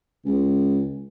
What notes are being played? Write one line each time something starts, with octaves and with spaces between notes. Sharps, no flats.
C#2